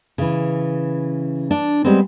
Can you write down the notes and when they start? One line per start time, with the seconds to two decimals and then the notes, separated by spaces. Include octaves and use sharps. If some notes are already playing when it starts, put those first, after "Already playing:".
0.18 C#3 E3
1.51 D4
1.84 G3 G#3 B3 C4